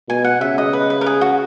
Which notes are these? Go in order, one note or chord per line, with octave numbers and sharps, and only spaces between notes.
B2 G#5
F#5
C#3 E5
D#5
B4
B4
A#4
G#4
F#4